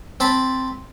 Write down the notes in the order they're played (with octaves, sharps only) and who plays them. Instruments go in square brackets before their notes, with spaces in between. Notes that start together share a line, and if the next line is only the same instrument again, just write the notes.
[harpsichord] C4 A5 B5